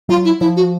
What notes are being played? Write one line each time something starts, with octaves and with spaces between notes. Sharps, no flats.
F#3 F4
E4
F3 E4
F#4